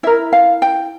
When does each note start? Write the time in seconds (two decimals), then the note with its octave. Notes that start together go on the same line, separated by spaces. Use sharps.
0.03 E4 A#4 E5
0.33 F5
0.62 G5